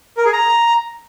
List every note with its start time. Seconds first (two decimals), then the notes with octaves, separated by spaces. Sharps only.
0.17 A#4
0.25 G#4
0.33 A#5